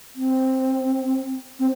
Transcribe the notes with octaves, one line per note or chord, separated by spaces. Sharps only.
C4
C4